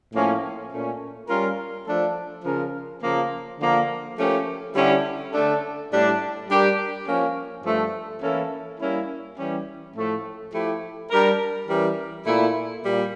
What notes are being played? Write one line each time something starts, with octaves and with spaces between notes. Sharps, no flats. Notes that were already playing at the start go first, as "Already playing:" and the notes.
A2 F3 A#3 C#4
A#2 A3 C#4
G3 C#4 F4 A#4
F3 A3 D4 A4
C#3 F3 C#4 F4 A#4
C#3 F3 A#3
D3 F3 A#3
F3 A3 C#4 G4 A#4
D3 G3 C#4 E4 G4
D3 A3 D4 A4
A2 G3 D4
G3 D4 G4 A#4
F3 A#3 C#4
G2 F3 A3
E3 A#3 C#4 E4 A4
G3 A#3 C#4 E4
E3 G3 C#4 G4
A2 F3 A3
F3 A3 E4 G4
G3 D4 G4 A#4
E3 G3 C#4 G4 A#4
A#2 A3 E4
A#2 G3